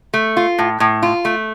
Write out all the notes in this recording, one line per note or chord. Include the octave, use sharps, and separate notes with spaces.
A3
F4
A2
A2
F4
A3